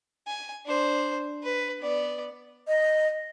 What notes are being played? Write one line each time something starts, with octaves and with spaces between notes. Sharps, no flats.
G#5
D4 C5
B4
B3 D5
D#5